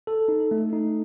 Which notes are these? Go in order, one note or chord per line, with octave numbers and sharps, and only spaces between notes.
A4
D#4
A3
D#4